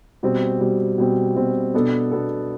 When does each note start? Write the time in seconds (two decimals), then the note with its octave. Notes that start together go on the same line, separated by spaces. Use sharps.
0.23 B2 G3 C4
0.61 B2 G3 C4
0.98 B2 G3 C4
1.36 B2 G3 C4
1.74 B2 B3 D4 A4
2.11 B2 B3 D4 A4